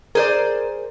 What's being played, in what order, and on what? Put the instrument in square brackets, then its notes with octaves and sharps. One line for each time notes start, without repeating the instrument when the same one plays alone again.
[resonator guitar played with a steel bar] G#4 C5 D5 [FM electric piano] A#4